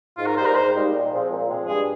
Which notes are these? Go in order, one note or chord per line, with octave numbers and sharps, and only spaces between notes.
G#2 F4
A#4
G3 A#3 D#4 G4 C5
A#4
G#2 C5
G3 A#3 D#4 G4
A#2
F3 G#3 C4
A#2
F3 G#3 C4
G2 G#4